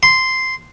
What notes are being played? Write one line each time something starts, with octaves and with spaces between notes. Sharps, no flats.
C6